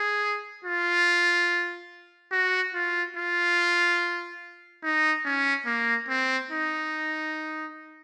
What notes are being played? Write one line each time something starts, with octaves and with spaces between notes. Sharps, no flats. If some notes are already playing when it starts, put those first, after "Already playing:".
Already playing: G#4
F4
F#4
F4
F4
D#4
C#4
A#3
C4
D#4